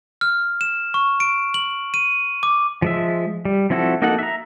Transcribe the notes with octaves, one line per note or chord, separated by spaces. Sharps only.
F6
E7
C#6
D7
F#7
D#7
D6
F3 G#3 E5
G3
F3 C4 E4 F#4 A4
A#3 D#4 F#4 A4 F#5
E5 A#5